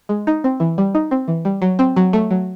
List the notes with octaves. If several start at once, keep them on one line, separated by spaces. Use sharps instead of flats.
G#3
D#4
C4
E3
G3
D#4
C4
E3
G3
F#3
C4
F#3
A3
F#3